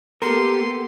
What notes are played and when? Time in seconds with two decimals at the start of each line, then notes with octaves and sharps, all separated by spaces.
0.22 A#3 B3 G4 A4 A#4 C6